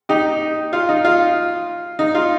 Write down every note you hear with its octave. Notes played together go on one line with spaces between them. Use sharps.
D#4 G4
F4
D#4
F4
D#4
F4